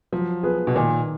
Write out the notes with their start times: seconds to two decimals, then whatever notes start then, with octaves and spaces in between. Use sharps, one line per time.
0.12 F3 F#3
0.43 B3 F4 G#4 B4
0.67 B2
0.76 A#2 D#3